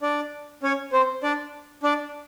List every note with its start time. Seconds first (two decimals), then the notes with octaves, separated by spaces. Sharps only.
0.02 D4 D5
0.63 C#4 C#5
0.93 C4 C5
1.23 D4 D5
1.83 D4 D5